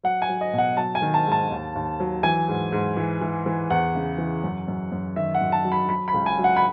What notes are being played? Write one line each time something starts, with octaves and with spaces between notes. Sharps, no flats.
F#3 F#5
G#5
F#3
D#5
B2 F#5
F#3 A5
G#5
D#3
A5
G#2
A5
D#2
D#2
F#3
E3 G#5
G#2
G#2
E3
E3
E3
E2 F#5
C#3
E3
F#2
F#2
F#2
D#3 E5
F#5
F#2
A5
F#3
B5
F#3 B5
B5
C#2
G#5
F#3
F#5
B5